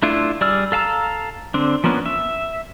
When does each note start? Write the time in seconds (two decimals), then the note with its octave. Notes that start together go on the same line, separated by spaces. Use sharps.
0.03 A3 D4 E4 F4
0.41 G3 G#4 D5 E6 F6
0.72 A4 F5 A5 A#5 E6
1.54 D3 C4 D4
1.84 F3 A#3 B3 C#4 D4
2.06 E5